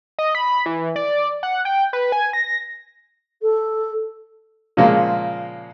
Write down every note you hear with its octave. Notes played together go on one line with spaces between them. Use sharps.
D#5
B5
E3
D5
F#5
G5
B4
G#5
A#6
A4
A#2 C#3 F3 G#3 A#3